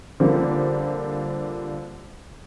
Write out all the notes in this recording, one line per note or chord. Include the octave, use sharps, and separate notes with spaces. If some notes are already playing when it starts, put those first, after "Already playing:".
D3 F3 G3 A#3 C4